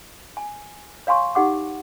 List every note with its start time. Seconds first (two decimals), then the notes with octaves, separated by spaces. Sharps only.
0.37 G#5
1.07 C#5 F5 G#5 C6 C#6
1.35 D#4 G4 F#5 D6